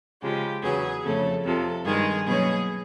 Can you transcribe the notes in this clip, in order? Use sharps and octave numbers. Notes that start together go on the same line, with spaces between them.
C#3 F3 G#3 G4
E2 C#3 F#3 B3 G#4
F2 C#3 F3 A3 C#4 A4
F2 C3 F3 A4
G2 D#3 G#3 G#4
B2 F#3 A#3 C#4 G#4